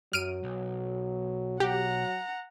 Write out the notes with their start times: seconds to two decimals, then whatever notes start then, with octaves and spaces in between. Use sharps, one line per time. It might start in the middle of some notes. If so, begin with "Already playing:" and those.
0.13 F#2 F#3 F6 D7 D#7
0.44 B1
1.60 F#3 G4 F#5 A#5